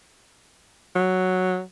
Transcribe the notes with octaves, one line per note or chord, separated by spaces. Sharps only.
F#3